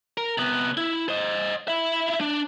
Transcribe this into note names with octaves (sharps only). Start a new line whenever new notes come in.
A#4
C3 B3
E4
C5 D#5
E4 E5
D4